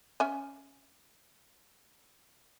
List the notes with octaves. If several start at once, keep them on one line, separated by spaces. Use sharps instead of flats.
C#4 E5 G#5